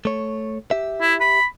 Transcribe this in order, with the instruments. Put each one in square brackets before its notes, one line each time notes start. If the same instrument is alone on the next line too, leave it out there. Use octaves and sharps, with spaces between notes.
[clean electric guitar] A3 C#5
G4 E5
[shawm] E4
B5